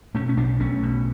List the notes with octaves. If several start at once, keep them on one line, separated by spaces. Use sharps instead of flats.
B2 A3 C#4
C#4
B1 B3 D4
B1 A3 C#4
B2